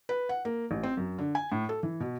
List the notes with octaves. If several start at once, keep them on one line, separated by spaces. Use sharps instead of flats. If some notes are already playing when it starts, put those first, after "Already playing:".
B4
F#5
A#3
A1
C4
F#2
D3
G#5
A2
A4
E3
B2